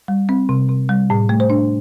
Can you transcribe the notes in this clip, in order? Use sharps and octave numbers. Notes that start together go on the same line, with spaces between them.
G3
C4
C3
C3
G3
A2
A3
C5
D4